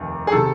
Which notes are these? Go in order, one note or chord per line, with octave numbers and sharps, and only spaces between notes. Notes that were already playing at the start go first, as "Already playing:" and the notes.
Already playing: F1 D#2 D#3
G#4
C3 D#3 A4